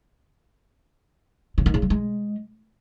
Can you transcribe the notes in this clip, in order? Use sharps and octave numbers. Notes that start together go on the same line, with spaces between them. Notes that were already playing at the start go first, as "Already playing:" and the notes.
C#3
D#3
C#3
G3
G#3